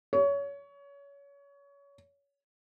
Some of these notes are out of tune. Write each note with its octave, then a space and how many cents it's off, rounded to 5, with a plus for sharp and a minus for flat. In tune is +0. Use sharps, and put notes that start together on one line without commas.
C#5 +25